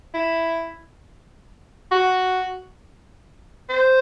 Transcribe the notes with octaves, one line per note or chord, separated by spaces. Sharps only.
E4
F#4
C5